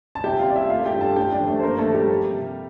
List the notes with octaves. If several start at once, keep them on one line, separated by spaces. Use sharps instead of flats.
A5
C3 G4 G5
F4 F5
G3 D5
E4 E5
A3 F4 F5
G4 G5
G2
A4 A5
A3 G4 G5
D4 D5
F3
A3 A4
C5
G2 A#3 A#4
A3 A4
F3
G3 G4
A#3
C3